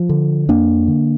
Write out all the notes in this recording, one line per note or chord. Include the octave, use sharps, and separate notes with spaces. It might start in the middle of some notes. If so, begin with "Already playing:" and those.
Already playing: F3
D3
F2 A#3 D4
D3